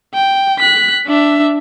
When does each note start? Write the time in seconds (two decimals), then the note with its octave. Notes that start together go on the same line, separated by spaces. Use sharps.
0.14 G5
0.59 F#6 B6
1.07 D4 E5